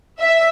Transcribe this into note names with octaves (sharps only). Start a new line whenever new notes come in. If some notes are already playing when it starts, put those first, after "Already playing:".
E5